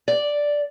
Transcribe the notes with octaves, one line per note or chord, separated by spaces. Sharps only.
D5